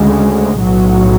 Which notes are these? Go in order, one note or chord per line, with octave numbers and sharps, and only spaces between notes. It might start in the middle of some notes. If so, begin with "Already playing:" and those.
Already playing: D2 C#3 G#3
B1 A2 F#3